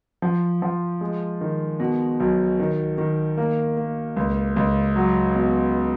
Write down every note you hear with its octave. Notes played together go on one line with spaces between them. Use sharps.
F3
F3
G#3
D#3
B2
B1
D#3
D#3
A#3
A#3
C#2
C#2
F#3
B2